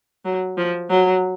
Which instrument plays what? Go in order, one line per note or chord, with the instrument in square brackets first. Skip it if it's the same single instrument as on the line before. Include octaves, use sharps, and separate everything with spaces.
[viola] F#3
F3
F#3